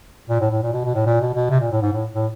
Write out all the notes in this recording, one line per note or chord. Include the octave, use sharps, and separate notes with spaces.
A#2
A2
A2
A#2
B2
B2
A2
A#2
B2
B2
C3
A#2
A2
G#2
A2
A2